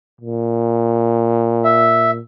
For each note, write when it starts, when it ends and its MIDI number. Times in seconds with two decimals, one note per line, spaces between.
0.21 2.20 46
1.64 2.11 76